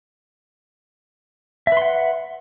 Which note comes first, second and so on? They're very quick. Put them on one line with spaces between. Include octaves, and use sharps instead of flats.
E5 B4 C6 F#5